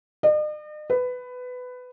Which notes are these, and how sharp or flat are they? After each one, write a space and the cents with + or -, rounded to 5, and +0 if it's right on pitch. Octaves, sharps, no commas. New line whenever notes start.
D#5 -45
B4 +15